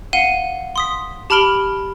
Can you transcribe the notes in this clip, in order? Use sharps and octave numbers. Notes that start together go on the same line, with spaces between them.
F5 F#5 C#7 D#7 G7
C6 D#6 B6
G4 A5 B5 F6 D7 G7